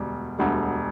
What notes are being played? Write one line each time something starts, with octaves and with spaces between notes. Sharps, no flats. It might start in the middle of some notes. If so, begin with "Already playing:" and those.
Already playing: E1 D2 G3
E1 D2 D3 G3